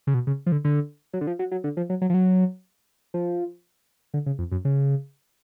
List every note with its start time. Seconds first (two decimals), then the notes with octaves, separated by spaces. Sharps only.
0.07 C#3
0.14 B2
0.27 C#3
0.46 F3
0.52 D3
0.65 D3
1.14 F#3
1.21 D3
1.27 F3
1.39 F#3
1.52 F#3
1.64 D3
1.77 F3
1.90 F#3
2.01 F#3
2.10 F3
2.14 F#3
3.14 F3
4.14 D3
4.26 C#3
4.39 F2
4.51 F#2
4.65 C#3